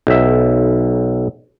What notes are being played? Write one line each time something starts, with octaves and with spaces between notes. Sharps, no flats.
B1 E5